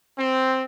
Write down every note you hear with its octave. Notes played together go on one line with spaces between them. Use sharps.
C4